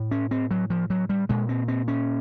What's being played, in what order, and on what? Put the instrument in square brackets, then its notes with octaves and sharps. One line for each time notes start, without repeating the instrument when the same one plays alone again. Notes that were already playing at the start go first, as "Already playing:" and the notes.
Already playing: [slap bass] A2
C#4
C4
F#3
F3
F#3
G3
A#2 G#3
C4
C4
C#4